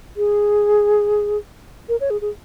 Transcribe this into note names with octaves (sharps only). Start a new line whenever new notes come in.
G#4
A#4
C#5
G#4
G#4